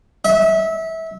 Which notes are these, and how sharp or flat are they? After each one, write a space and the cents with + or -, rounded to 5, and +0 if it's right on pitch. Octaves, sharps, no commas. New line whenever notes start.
E5 -25